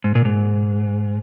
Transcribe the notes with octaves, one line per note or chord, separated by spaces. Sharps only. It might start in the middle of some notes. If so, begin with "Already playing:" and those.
G#2
A#2
G#2